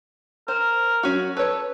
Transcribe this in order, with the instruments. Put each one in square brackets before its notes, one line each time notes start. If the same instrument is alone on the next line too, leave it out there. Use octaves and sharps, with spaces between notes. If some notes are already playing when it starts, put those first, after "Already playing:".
[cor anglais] A#4 [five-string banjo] C5
[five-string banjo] F#3 C#4 F#4
[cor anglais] A4 [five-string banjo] B4 C#5